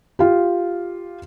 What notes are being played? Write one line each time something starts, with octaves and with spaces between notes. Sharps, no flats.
F4 G4